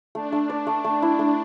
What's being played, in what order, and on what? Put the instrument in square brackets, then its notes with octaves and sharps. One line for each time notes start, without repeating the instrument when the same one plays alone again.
[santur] A3 [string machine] D4
[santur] A3
D5
A3
[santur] A3 [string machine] D4
[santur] E4
A3